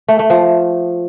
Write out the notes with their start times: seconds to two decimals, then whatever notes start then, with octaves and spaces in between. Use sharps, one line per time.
0.08 A3
0.19 A3
0.30 F3